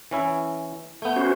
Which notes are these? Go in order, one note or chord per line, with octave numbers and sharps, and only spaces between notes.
E3 C#4 E4
A3 B3 G6
C#4 F#4 C5